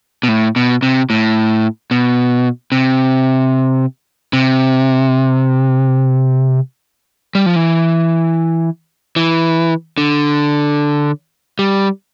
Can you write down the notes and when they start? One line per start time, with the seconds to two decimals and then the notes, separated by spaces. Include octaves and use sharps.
0.23 B2
0.28 A2
0.56 B2
0.83 C3
1.10 A2
1.91 B2
2.72 C3
4.33 C3
7.35 G3
7.46 F3
7.56 E3
9.16 E3
9.98 D3
11.59 G3